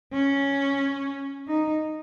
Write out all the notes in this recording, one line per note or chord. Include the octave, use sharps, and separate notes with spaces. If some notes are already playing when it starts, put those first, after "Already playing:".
C#4
D#4